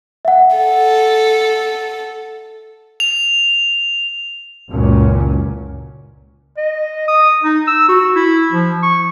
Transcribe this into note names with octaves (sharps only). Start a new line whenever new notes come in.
E5 F#5
A4
F7
F#1 C#2 A#2 C#4
D#5
D#6
D#4
E6
F#4
E4
F3
C#6